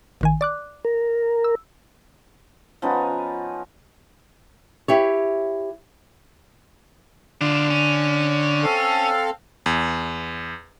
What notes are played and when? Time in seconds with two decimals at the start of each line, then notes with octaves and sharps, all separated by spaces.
0.21 A1 D#3 G#5
0.41 D5 D6 F#6
0.85 A#4
1.44 E6
2.82 F3 B3 C#4 D#4
4.88 E4 G4 C#5
7.41 D3 D4 F4
7.70 C#4
8.63 C4 A4 F5
9.66 E2